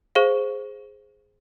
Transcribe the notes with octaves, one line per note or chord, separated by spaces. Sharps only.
G#4 C5 F5